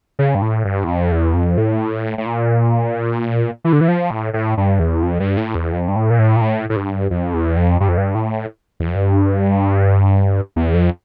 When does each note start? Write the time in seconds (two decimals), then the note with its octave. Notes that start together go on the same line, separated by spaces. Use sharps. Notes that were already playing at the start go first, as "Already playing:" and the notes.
0.19 C#3
0.35 G2
0.42 A2
0.65 G2
0.84 E2
0.88 F2
1.12 E2
1.34 F2
1.58 A2
2.18 A2
2.26 A#2
3.65 E3
3.73 D3
3.81 E3
3.88 F3
4.11 A2
4.34 A2
4.57 G2
4.80 E2
5.03 F2
5.20 G2
5.37 A2
5.55 E2
5.72 F2
5.88 G2
5.96 A2
6.10 A#2
6.19 A2
6.36 A#2
6.41 A2
6.69 A2
6.76 G2
7.10 F2
7.34 E2
7.57 F2
7.80 G2
7.89 F2
7.98 G2
8.15 A2
8.80 E2
8.87 F2
8.96 G2
10.56 E2
10.74 F2